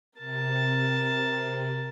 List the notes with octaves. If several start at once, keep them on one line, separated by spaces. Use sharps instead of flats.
C3 A#4 A5